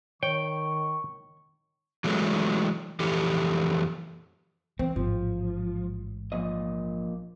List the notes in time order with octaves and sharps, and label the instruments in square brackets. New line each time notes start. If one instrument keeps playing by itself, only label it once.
[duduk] D#3 [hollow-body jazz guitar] C#5 [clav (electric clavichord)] G5 [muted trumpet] C#6
[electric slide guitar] E3 F#3 G#3 A3
F2 E3 G4 A4
[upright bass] E3 [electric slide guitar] C4
[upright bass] A1 G#2 [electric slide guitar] F3
[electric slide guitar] A#2 F3 D#5